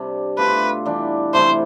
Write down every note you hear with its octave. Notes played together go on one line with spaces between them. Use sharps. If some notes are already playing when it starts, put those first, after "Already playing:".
Already playing: C3 G3 D4
B2 A3 D4 F4 B4
E3 G3 D4
C3 E3 A3 C5